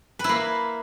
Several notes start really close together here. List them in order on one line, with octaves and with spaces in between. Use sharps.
B4 E4 A#3